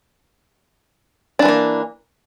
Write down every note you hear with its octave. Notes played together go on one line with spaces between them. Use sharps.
E3 G#3 A#3 D4